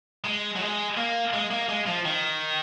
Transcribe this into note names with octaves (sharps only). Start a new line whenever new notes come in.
G#3
F#3
G#3
A#3
G#3
A#3
G#3
F3
D#3